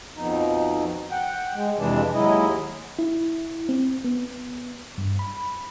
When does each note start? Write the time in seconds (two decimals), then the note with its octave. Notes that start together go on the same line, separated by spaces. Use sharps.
0.16 F2 B2 D#4
1.11 F#5 G5
1.54 G#3
1.77 F2 C3 E3 G#3 D4
2.14 D#2 F#3 G#3 E4 D#5
2.99 E4
3.69 C4
4.04 B3
4.98 G2
5.19 B5